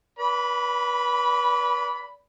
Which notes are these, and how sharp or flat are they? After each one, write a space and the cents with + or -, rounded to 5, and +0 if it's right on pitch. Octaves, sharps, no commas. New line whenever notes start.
B4 -30 D5 -35 B5 +0